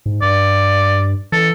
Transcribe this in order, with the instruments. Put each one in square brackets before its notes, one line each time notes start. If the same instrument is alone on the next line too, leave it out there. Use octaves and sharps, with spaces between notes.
[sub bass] G#2
[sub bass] G2 [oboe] D5
[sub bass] E3 [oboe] A4